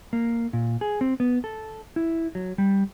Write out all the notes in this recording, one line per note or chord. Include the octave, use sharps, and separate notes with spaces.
A#3
A#2
G#4
C4
B3
A4
E4
F#3
G3